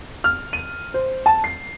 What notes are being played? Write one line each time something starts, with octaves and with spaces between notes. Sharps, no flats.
F6
D#7
C5
A5
C7